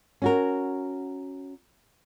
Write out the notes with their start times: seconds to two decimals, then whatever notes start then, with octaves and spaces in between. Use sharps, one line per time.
0.22 C#4 F#4 A#4